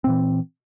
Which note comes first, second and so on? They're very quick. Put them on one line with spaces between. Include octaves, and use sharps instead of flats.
C4 A#2 E3